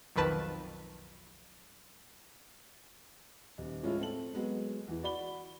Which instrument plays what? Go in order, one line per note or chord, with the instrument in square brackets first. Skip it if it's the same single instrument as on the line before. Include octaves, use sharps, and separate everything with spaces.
[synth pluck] B1 F2 D#3 B4 A5
[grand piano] D#1
A2 F3 G#3 C#4 E4 F4
C4 A4 F#7
F#3 G#3 B3
E2 E3
F#4 D5 B5 G7